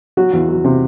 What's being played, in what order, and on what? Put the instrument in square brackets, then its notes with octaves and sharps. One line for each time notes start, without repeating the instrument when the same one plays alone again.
[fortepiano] F#3 F#4
E2
F#3
C3